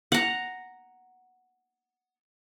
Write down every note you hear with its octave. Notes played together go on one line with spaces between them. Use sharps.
F#5 A#5